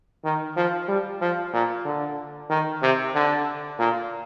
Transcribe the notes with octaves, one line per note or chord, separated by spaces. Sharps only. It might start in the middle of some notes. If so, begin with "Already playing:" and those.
D#3
F3
G3
F3
A#2
D3
D#3
C3
D3
A#2